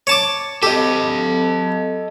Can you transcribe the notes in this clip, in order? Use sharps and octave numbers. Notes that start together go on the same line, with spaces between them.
C#5 A5 D6
G4 A4 D#5